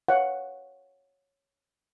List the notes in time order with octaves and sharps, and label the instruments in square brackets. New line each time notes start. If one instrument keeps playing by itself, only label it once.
[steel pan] C#5 F5 F#5